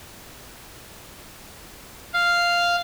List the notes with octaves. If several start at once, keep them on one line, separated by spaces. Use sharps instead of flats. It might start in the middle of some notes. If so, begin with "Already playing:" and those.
F5